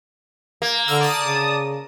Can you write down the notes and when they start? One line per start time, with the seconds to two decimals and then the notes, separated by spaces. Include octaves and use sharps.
0.62 A#3
0.88 D3 E6 F6
1.01 D5 A5 D#6
1.19 C#3